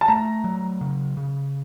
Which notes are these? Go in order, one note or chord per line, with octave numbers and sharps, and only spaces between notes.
A5
A3 A#5
F#3
C#3
C#3